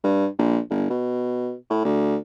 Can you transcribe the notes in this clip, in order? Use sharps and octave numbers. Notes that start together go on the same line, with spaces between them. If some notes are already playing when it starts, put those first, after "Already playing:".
G2
A#1
G1
B2
A2
D2